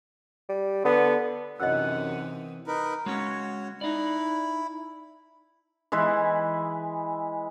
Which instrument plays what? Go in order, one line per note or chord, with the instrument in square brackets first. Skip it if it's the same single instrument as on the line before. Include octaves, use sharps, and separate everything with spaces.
[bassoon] G3
[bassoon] D3 [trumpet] B3
[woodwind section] F#2 F#5 [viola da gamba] C3 E3 D#4 [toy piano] D#5 E6
[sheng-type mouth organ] D#4 A#4 B4
[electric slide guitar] G#3 C#4 [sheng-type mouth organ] F#4 C#5
[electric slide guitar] D#4 D5 [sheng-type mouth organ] E4
[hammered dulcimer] E3 G#3 E4 B4